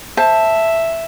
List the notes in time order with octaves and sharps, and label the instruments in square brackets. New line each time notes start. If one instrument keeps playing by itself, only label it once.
[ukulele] C5 A5 [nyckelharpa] E5